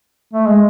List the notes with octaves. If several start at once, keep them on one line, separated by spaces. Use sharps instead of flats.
A3
G#3